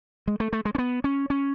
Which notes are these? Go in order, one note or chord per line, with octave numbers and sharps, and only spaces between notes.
G#3
A3
A3
G#3
C#4
B3
C#4
C#4